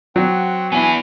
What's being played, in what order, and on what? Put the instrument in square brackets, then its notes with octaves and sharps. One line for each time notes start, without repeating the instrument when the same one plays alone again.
[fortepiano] F#3 [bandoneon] C4 F#5 G5
[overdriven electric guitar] B3 E4 [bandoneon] D4 [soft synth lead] G#5